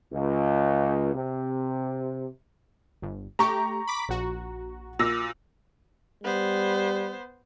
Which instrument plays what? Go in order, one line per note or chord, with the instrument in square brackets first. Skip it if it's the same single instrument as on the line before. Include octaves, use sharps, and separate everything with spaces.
[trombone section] C#2
C3
[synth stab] G1
[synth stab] A3 G4 [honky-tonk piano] A#5 C#6
[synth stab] B5 D6 B6
A#1 F#4
[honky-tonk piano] A#2 E6 A#6
[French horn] G3 [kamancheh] B3 C5